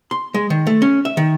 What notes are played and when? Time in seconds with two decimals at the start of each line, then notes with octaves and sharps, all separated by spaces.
0.11 C6
0.34 G#3
0.50 D#3
0.67 A3
0.82 C#4
1.05 E5
1.17 D#3